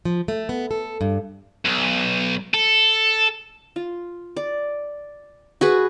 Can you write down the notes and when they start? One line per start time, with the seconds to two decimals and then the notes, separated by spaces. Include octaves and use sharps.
0.05 F3
0.28 A3
0.49 B3
0.71 A4
1.01 G2
1.65 B1
2.54 A4
3.76 F4
4.37 D5
5.61 F#4 G#4 B4